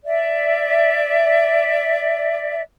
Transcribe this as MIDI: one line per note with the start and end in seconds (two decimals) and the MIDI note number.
0.05 2.61 74
0.05 2.61 76